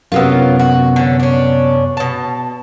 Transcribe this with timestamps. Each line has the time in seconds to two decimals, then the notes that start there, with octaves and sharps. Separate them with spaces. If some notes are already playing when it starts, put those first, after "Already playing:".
0.12 F#2 C3 F#3 A#3 B3 F4
0.59 F#4
0.96 D3 C#4
1.20 C#4 D4
1.97 B2 A5